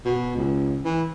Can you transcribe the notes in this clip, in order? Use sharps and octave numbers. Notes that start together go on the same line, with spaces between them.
B2
C#2
E3